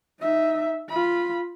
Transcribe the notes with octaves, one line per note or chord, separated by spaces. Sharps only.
D#4 E5
F4 B5